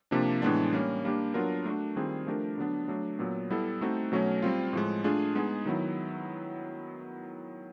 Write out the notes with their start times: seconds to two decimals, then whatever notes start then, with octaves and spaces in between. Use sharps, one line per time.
0.11 C3 F3 A#3 D4
0.42 A2 E3 G#3 B3 D4
0.73 G3 A#3 C#4
1.04 G3 A#3 D4 G4
1.34 F#3 B3 D4 F4 A#4
1.66 A3 D4 F#4
1.96 D#3 G3 C4 F4 G#4
2.27 F3 A3 D4 G4 A#4
2.58 D3 F#3 B3 D4
2.88 F#3 A3 D4
3.19 A#2 F#3 B3
3.50 G3 B3 E4 A4
3.81 A3 C4 D#4 F#4 A4
4.12 B2 F#3 A3 C#4
4.42 G3 C4 F4
4.73 A2 F3 G#3
5.04 A3 D4 F4 G#4
5.35 G#3 B3 D#4 G#4
5.66 D#3 F#3 B3 E4